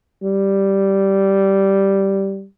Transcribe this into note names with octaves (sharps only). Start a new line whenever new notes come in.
G3